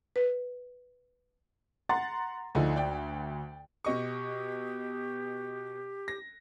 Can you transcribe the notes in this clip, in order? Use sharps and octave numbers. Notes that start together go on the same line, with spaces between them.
B4
F#5 A#5 C6 A6
D2 D3 F3 D#4
D5 G5
B2 G4 D#5 C#6
A#6